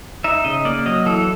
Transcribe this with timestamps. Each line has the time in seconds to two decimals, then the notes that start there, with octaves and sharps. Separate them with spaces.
0.24 D#4 E5
0.45 C#3 D#5
0.65 A#3 D5
0.86 F#3 D#5
1.06 E3 A4